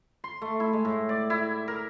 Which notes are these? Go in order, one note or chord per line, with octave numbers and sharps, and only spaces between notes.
C6
A3
E4
G#3
A2
D5
E4
A#4